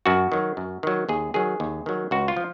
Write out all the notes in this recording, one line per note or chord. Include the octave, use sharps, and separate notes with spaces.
F#2 F#4
D#3 F#3
F#2
D#3 F#3
D#2 G#4
D#3 F#3 G#4
D#2
D#3 F#3
C#2 F#4
F4
F3